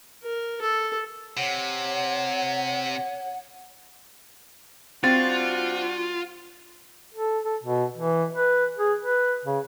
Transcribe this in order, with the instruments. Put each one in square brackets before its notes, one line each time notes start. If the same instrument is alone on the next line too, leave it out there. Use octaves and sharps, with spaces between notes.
[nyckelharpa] A#4
A4
[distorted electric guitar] C3 [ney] C#5 [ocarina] F#5
[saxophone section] G3 D4 F#4 [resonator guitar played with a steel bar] C4 [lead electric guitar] F4 [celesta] A6
[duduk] A4
A4
B2
E3
B4
G#4
B4
C#3